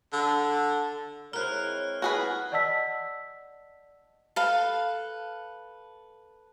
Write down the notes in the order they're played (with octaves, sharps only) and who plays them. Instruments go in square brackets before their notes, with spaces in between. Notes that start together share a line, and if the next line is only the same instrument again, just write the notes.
[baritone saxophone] D3
[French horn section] G#3 C#5 [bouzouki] C4 E4 A#4 [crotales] F6 F#6
[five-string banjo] F#4 G#4 B4
[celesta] D5 D#5 F#5 A5 E6 B6
[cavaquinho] A4 B4 F5